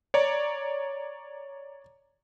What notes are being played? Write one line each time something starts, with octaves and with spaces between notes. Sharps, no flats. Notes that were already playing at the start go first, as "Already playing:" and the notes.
C#5 D5 A#5